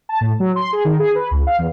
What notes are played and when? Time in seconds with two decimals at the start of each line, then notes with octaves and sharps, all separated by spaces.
0.09 A5
0.21 A2
0.40 F#3
0.56 C6
0.73 G#4
0.85 D#3
0.99 G#4
1.15 B4
1.31 C#2
1.47 F5
1.59 E2